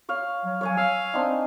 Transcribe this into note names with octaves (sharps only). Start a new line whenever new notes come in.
C#5 F5
F#3
F#3 C#5 F5 G#5
F5 E6
C4 D4 D#4